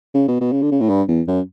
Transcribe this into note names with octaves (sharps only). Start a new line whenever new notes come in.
C#3
B2
B2
C#3
D3
C#3
A2
G2
E2
F#2